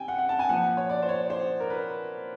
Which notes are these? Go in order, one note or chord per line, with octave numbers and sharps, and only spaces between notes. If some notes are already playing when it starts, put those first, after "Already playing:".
Already playing: C3 G5 G#5
F#5
F#5
A5
G#5
A#2 F3 F#5
C#5
D5
C5
C#5
C5
A#4
B4